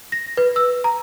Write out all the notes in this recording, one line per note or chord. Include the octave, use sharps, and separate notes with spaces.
A#6
B4
E6
A#5